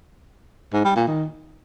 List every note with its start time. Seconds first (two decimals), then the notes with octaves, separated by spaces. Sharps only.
0.73 G#2
0.85 G3
0.96 A#2
1.08 D#3